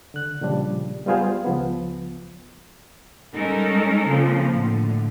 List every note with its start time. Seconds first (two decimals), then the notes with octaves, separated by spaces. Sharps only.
0.14 D3 F#6
0.41 A#2 C#3 F3 G3 D4
1.06 G3 B3 F4 G#4 C5
1.44 C#2 F3 B3
3.35 G3 G#3 C#4 D#4 A4 A#4
4.06 C#3 F3 A#3 C4
4.53 A2 D3